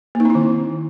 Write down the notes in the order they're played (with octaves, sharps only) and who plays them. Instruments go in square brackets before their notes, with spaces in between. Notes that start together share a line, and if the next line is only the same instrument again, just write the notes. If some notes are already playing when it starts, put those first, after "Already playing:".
[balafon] A#3
D#4
C4
E4
D#3